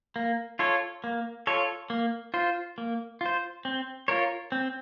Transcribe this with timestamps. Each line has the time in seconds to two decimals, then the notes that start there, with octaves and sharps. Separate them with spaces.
0.16 A#3
0.59 F4 A4 C#5
1.04 A#3
1.47 F4 A4 C#5
1.90 A#3
2.34 F4 C5
2.78 A#3
3.21 F4 C5
3.65 C4
4.08 F4 A#4 C#5
4.52 C4